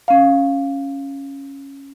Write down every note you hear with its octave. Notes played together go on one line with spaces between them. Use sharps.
C#4 F5